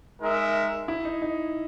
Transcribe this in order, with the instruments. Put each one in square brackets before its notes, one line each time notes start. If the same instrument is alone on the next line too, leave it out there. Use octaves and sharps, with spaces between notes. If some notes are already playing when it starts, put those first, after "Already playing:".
[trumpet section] G#3 D#4 A#4 E5
[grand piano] E4
D#4
D#4